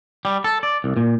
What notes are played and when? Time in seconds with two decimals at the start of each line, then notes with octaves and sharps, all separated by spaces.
0.25 G3
0.44 A4
0.63 D5
0.84 C2
0.97 A#2